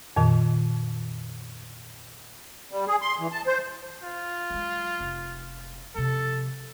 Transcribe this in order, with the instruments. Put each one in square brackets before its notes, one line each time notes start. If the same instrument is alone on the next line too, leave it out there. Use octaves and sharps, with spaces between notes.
[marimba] F2 A#2 D#3
[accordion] G3
G#4
C6
E3
A5
C5
[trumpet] F4
[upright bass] F#3 G#3
F1
[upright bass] C3 F3 [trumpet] A4